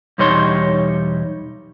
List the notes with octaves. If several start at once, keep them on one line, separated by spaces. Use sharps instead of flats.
B1 E2 G3 D#4 C#5 C6